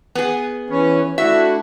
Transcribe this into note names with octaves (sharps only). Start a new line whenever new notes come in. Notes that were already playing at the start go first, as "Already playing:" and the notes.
B3 G#4
E3 C#4 B4 C#5
A3 D4 E4 F#4 E5